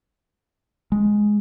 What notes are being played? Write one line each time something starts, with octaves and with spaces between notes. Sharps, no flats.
G#3